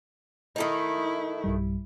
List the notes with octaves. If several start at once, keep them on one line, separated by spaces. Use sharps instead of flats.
D#3 A3 D#4 E4
B1 G2 G3